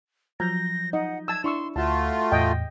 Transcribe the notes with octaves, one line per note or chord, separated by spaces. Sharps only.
F3 F#3 A#5 G6 A#6
D#4 D#5 F#5
A5 E6 G#6
D4 E4 C6 C#6 E6
D2 A3 F4 F#4 A5
E2 A2 D#5 G5